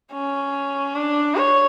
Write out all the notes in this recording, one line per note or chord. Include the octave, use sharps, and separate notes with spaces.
C#4
D4
C#5